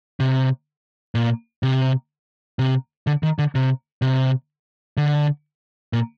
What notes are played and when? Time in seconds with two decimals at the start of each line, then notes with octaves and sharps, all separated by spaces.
0.20 C3
1.15 A#2
1.63 C3
2.59 C3
3.07 D3
3.23 D#3
3.39 D3
3.55 C3
4.02 C3
4.97 D3
5.93 A#2